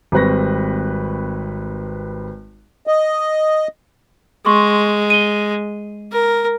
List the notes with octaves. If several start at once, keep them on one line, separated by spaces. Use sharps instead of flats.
G#1 G3 C4 B4 C#6 A#6
D#5
G#3 C6 C#6
D#7 G7
A#4